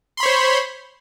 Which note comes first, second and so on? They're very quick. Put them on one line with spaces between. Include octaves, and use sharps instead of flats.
C6 B5 C#5 C5